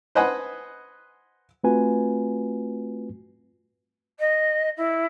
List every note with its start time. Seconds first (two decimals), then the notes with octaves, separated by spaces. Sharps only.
0.15 B4 C5 D#5 F#5 G#5 B5
1.64 A3 C4 F4 F#4 B4 G#5
4.19 D#5
4.76 E4